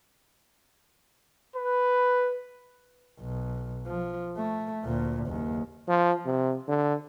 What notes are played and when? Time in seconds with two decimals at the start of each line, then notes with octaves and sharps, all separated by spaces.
1.56 B4
3.20 B1
3.86 F3
4.37 A3
4.84 D2 A#2
5.26 F#1 D#2
5.88 F3
6.25 C3
6.67 D3